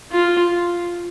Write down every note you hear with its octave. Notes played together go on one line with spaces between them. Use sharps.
F4